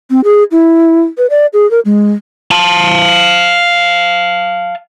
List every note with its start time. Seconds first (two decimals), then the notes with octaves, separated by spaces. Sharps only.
0.10 C4
0.24 G#4
0.51 E4
1.18 B4
1.30 D5
1.53 G#4
1.71 A#4
1.85 G#3
2.51 F5 A5